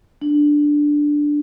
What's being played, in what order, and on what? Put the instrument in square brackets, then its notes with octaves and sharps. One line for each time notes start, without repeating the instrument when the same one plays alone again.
[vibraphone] D4